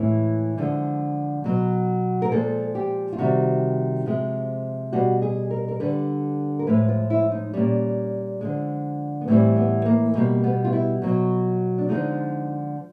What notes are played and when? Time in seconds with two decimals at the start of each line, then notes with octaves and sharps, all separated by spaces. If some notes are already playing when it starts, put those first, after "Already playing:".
Already playing: A2 E3 G#3
0.58 D3 F3 G#3
1.44 B2 F#3
2.22 A#4
2.31 A#2 F3 G#3 A4
2.75 G4
3.13 F4
3.18 C3 D#3 G3 F#4
4.06 C3 F3 G#3
4.93 B2 G3 F#4
5.22 G#4
5.51 A#4
5.68 A#4
5.80 D3 G3 B4
6.59 A#4
6.67 A2 F3 G#3 B4
6.88 F4
7.10 E4
7.32 D#4
7.54 A#2 G3 C#4
8.41 D3 F3 G#3
9.21 B3
9.28 A2 E3 G3 C4
9.57 B3
9.85 A#3
10.15 B2 G3 A#3
10.44 B3
10.64 F4
10.73 E4
11.02 B2 F#3
11.78 D4
11.89 D3 F3 G#3 D#4